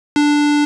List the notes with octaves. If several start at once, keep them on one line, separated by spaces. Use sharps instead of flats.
D4